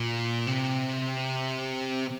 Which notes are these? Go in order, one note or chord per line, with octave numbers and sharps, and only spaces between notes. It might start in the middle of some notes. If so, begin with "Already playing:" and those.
Already playing: A#2
C3